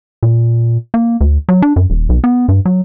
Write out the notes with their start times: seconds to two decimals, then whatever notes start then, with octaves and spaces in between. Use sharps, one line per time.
0.23 A#2
0.94 A#3
1.21 D2
1.49 F#3
1.62 D4
1.76 F#2
1.90 D#1
2.09 B1
2.24 B3
2.48 G2
2.65 F#3